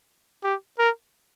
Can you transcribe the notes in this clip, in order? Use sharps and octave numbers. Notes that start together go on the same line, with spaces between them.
G4
A#4